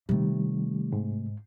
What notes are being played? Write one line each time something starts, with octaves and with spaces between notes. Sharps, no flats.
C3 D#3 G3 A3
G#2